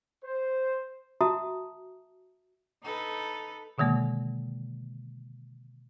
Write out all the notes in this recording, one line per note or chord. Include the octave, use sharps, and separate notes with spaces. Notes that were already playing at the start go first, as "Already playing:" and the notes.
C5
F#4 E5 A5 A#5 D#6
D#4 A4 B4
B2 D3 D#3 G#3 A#3